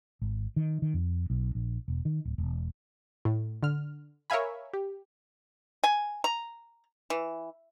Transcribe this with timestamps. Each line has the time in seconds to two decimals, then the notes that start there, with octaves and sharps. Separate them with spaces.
0.21 G#1
0.56 D#3
0.82 D#3
0.94 F2
1.30 B1
1.55 A#1
1.88 E1
2.05 D#3
2.25 D1
2.38 E1
3.25 A2
3.63 D3 F6
4.30 A#4 C#5 E5 F5 G#5 B5
4.73 G4
5.84 G#5
6.24 A#5
7.10 E3